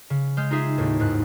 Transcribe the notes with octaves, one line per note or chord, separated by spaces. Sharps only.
C#3
G#3 F6 G6
D#4 F4 G#4 E5
D#2 A2
F#1 G#2 F#6